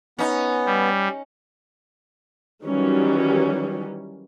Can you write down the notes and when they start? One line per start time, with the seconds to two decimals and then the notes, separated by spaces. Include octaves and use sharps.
0.18 B3 C#4 D#4
0.66 G3
2.63 D#3 E3 F#3 G3 C#4